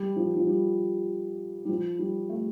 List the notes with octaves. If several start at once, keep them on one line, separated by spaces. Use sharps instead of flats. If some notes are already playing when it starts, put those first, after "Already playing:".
Already playing: G3
F3
F3
G3
G3
F3
G3
A3